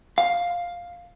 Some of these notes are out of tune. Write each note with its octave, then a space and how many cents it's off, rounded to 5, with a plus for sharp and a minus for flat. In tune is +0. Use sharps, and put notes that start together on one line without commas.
F5 +5